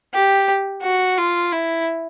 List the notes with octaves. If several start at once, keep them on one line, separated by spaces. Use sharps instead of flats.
G4
F#4
F4
E4